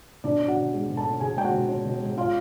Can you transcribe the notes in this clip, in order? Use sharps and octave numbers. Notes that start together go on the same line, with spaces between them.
B2 D4 D5
C#4
F#4 F#5
B2
G#3
B2
A4 A5
C#4
B2 G#4 G#5
G#3 G5
F#4 F#5
B2
C#4
B2
G#3
C#4 F4 F5